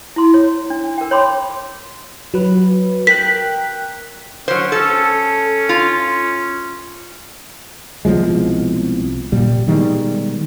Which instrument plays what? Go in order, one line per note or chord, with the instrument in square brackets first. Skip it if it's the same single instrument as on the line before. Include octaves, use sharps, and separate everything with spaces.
[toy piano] E4 C6
C#5
D4
A#4 G5
C#5 B5 C6 D6
[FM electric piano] F#3 B4
[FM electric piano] A#4 G5 F#6 [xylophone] B6
[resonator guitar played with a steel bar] F#3 C5 [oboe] C#4
[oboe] C#4 [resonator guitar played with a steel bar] A4
[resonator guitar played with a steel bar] F4
[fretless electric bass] C2 B2 F3 G#3
A#2 G3
B2 D#3 G3 G#3